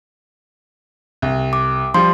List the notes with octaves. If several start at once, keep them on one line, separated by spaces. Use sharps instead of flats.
C2
D6
F3 G3 C6